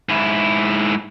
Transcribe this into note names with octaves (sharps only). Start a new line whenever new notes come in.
G#2 E4